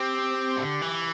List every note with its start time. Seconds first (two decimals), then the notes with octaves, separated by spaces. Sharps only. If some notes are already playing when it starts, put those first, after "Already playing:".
Already playing: C4 G4
0.57 D3
0.82 E3